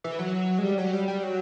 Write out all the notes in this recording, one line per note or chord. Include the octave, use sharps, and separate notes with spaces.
E3
F#3
G#3
G3
F#3
G3
G3
F#3